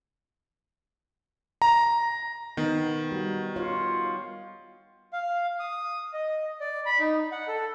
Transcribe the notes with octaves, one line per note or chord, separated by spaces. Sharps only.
A#5
D#3 B3
G3 F#4
F4 C#5 F5
F5
D#6
D#5
D5
B5
D#4
F#5
A4